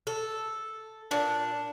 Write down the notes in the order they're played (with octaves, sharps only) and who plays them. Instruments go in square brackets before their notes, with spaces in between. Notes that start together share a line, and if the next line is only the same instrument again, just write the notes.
[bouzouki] A4
[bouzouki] A#2 [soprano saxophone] D4